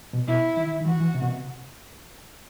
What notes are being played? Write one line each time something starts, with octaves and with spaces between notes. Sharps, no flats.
B2
B2 E4
D#3
D#3
E3 F#4
E3
C3
B2
C3